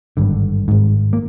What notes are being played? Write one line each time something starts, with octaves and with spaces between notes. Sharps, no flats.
G#1 G2 D3
G#1 G#2
A#3